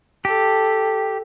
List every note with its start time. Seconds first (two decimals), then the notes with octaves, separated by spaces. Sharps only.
0.25 G4 A4